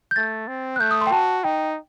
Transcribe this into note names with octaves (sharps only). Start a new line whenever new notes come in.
G6
A3 A6
C4
F#6
A3 G6
D#6
C6
G5
F#4 A5
D#4 G5